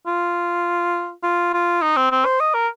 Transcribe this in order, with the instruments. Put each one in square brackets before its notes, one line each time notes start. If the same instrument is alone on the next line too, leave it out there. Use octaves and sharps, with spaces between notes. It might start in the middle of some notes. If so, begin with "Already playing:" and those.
[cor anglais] F4
F4
F4
D#4
C4
C4
C5
D#5
A#4